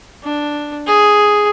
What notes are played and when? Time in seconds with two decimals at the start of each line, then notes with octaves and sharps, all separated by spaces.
0.23 D4
0.86 G#4